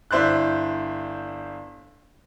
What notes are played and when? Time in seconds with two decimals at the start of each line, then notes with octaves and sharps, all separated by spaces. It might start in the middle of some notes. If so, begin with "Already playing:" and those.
0.11 G1 E4 C5 D5 F#6